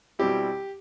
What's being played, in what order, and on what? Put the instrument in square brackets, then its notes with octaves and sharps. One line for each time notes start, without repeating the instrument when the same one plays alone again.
[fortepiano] B2 G3 C4 E4 G4